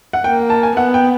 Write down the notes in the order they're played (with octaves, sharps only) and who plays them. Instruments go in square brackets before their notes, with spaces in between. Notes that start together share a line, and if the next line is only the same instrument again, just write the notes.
[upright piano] F#5
[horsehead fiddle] A#3 [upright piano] G5
[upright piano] A5
G#5
[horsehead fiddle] B3 [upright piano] F#5
[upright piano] G5